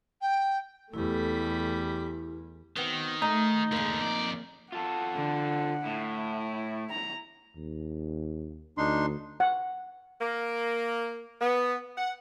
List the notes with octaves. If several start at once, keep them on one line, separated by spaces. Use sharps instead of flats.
G5
E2 G3 A3 E4 G4 B6
D#3 B3 C4 F#4
A3 D#4
E2 D3 A#3 G#4
F2 D5
F4 A4 F#5
D3
A2 E4
A#5
D#2
D2 D4 D#4 C6
F#5
A#3
B3
F#5